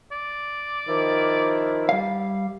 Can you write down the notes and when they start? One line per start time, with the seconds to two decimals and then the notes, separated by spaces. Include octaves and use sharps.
0.11 D5
0.88 D#3 F3 E4
1.89 G3 F5